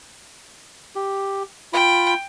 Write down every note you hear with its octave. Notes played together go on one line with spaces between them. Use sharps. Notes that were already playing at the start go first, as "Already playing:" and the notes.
G4
F4 G5 B5